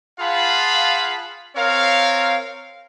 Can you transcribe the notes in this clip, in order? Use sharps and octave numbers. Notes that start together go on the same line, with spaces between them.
F4 G#4 F5 F#5 A5 B5
C4 A#4 C#5 F5